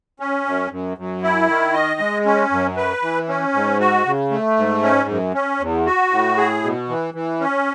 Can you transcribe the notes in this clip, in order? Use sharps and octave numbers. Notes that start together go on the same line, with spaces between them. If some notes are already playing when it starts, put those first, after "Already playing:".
C#4
F#2
F#2
F#2
E4
D#3
D#5
G#3
C#4
F#2
B4
E3
C#4
G#2
F#4
C#3
A3
G#2
C#4
F#2
C#4
E2
F#4
A2
G#4
B2
E3
E3
C#4